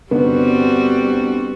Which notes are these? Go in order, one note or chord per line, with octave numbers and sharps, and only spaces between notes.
G1 G3 B3 C4 F#4